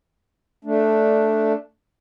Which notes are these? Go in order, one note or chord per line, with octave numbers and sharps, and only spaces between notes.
A3 D4